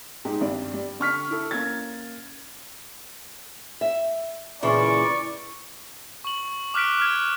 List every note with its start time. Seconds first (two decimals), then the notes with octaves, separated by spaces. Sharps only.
0.25 G#2 G#3 D#4 G4
0.40 G#1 G2 G3 D5
0.74 G3
1.00 D3 C#6 F6 B6
1.31 E4 A4
1.51 A#3 C#4 G#6 A6
3.81 E5
4.63 A#2 C#3 E3 D5 C#6
6.24 C#6 F#7
6.74 D6 F6 F#6 B6 D7
7.00 F6 F#6 G#6